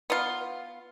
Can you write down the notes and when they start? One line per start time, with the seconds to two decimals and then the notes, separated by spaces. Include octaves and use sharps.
0.10 B3 F4